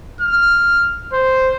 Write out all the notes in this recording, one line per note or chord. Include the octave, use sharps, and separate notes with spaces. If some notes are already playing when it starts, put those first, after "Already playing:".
F6
C5